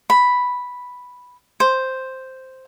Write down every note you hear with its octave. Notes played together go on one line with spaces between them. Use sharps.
B5
C5